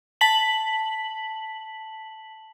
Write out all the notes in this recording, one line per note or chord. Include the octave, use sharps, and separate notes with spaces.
A5 B6 F#7